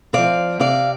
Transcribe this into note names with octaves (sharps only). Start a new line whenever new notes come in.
F3 C4 D5 F5
C3 D5 F5